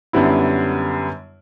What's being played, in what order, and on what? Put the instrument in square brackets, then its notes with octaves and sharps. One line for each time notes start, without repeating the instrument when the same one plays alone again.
[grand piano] F#2 D3 G3 B3 E4